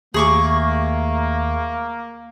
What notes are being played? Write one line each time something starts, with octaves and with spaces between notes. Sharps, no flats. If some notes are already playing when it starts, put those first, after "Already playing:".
D#2 A3 A#3 G#4 C#6 D6